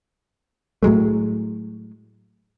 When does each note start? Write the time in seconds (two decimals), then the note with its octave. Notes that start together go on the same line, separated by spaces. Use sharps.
0.83 A2 F#3 G#3 A3